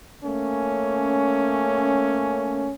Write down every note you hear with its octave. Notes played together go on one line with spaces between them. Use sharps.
A3 A#3 C#4